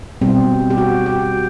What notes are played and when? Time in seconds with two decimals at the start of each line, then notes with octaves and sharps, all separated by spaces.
0.21 B2 G3 C4
0.70 G4
0.78 F#4
1.06 G4